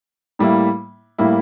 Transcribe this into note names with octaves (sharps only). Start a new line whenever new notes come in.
A2 G3 A#3 E4
A2 G3 A#3 E4